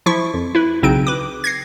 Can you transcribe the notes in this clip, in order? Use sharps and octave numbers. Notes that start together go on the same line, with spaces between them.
F3 E4 C#6
F2
E4 B4
B1 C#3 C4 D#4 D7
B4 D6
G#6 A#6 C7